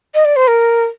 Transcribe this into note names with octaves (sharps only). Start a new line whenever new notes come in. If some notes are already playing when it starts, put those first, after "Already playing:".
D#5
D5
C5
A#4